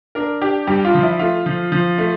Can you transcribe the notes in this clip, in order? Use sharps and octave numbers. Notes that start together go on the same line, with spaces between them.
D4 A#4
D4 G4
G2 G4
F4
F3
E4
A3 F4
F3
F3
A3